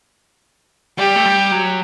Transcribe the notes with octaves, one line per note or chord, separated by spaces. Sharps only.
G3 G4
A3
G3
F#3